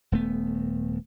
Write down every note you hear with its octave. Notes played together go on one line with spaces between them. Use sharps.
D#1 A3 B3